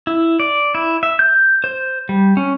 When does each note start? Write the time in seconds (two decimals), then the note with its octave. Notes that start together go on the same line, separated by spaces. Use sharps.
0.07 E4
0.40 D5
0.75 E4
1.03 E5
1.19 G6
1.64 C5
2.09 G3
2.37 C#4